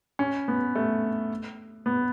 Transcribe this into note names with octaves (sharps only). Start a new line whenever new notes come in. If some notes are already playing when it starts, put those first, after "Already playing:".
C#4
B3
A3
B3